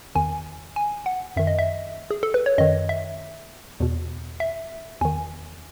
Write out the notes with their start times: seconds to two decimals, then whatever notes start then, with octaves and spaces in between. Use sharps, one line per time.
0.15 E2 D#3 G#5
0.76 G#5
1.06 F#5
1.36 F#2 D#3 E5
1.47 D#5
1.59 E5
2.11 G#4
2.23 A4
2.34 B4
2.46 C#5
2.58 F#2 D#3 D#5
2.89 E5
3.80 E2 B2
4.40 E5
5.01 E2 D#3 G#5